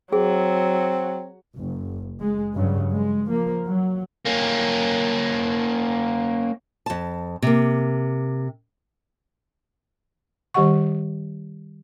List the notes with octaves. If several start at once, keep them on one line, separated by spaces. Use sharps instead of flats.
F#3 C4 G#4
F#1
G#3
G2 C#3 F#3
G#3
F3 A#3
F#3
A#3 C#4
F2 A5
C3 A#3
D#3 G3 G4 D#5 F#5 C#6